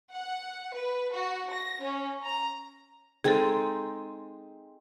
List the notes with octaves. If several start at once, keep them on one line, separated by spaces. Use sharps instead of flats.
F#5
B4
F#4
A#6
C#4
A#5
G#3 C4 D#4 G#4 A4